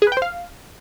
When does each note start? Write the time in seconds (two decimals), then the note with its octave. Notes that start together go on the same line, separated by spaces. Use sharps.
0.02 G#4
0.07 B4
0.12 G5
0.17 C5
0.22 F5